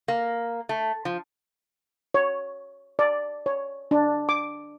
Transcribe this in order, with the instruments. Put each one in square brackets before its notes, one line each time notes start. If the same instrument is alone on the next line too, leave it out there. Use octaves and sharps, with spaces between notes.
[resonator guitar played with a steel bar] A#3
A3
F3
[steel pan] C#5
D5
C#5
D4
D6